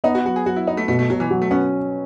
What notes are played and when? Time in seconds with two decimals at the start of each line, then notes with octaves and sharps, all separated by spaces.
0.04 B3 D#4
0.15 F#4
0.25 F#3 F#4
0.36 G#4
0.46 F#3 F#4
0.56 E4
0.67 D#4 B4
0.77 A3
0.88 B2 A3
0.99 A3
1.10 B2 F#3
1.20 E3
1.31 F#3
1.42 A3
1.51 B3 C#4